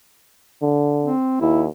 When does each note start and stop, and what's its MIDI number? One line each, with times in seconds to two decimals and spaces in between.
0.62 1.12 50
1.03 1.41 60
1.41 1.68 39
1.41 1.63 64